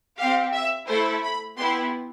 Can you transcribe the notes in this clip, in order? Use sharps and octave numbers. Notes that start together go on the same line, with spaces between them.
C4 G4 F5
E5
A3 E4 A4 C5
B5
B3 E4 G4 C6